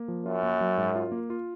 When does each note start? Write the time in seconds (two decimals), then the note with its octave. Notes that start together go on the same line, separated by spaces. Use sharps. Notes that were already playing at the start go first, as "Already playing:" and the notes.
Already playing: A#3
0.08 F3
0.26 F#2 F4
0.43 A#3
0.61 F#3
0.78 G#2
0.95 F4
1.12 A#3
1.30 F4